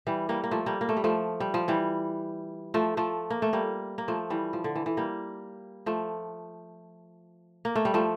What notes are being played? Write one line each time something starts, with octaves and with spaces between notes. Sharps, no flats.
E3 G3
G3 A#3
A#3
F3 A3
G3 A#3
A#3
A3
G3
F3 A3
G3
F3
E3 G3
F3 A3
F3 A3
A#3
A3
G3 A#3
A#3
F3 A3
E3 G3
F3
D3
E3
E3
G3 A#3
F3 A3
A#3
A3
G3
F3 A3